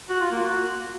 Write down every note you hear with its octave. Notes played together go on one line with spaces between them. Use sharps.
F#4
F4
A#3
F#4